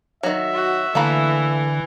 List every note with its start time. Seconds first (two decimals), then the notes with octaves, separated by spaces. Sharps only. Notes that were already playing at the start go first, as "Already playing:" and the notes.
0.23 D#3 F#3 E5
0.54 F#4
0.95 D3 E3 A3 A#3 B5